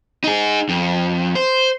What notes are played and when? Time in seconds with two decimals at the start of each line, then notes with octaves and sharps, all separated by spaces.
0.24 D#4 G#4
0.69 F2
1.35 C5